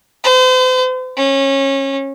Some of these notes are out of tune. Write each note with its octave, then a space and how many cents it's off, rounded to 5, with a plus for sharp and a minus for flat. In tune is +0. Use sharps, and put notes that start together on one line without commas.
C5 -40
C#4 -25